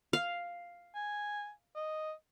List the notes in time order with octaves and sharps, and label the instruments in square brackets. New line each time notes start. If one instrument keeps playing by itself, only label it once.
[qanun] F5
[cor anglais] G#5
D#5